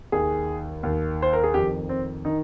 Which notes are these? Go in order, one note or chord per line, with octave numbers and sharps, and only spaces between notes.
D#2 D#3 G#4
D#2 D#3
C5
A#4
G#4
F2 D#3 G4
C4
D#3 D#4